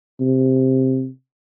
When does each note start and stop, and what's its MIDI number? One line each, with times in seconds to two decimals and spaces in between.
0.20 1.08 48